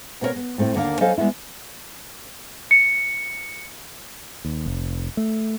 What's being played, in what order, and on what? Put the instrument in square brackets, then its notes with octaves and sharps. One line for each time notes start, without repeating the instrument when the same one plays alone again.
[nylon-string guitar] B2 A#3 C4 G4 A#4 C#5
B3
A2 A3 C4 E4
D#2 D3 A#3 A#4 F5
F#3 C#4 A4 C5 D#5 F5
G3 G#3 B3 E4
[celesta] C#7
[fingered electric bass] D#2
F1
A3